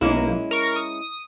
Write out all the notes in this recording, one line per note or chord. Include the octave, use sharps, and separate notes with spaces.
B1 G#3 A#3 C#4 E4
A#4 C#6
D#6